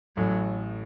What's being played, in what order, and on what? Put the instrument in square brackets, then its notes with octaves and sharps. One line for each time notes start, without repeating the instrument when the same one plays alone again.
[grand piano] A1 A2 A3 [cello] F#3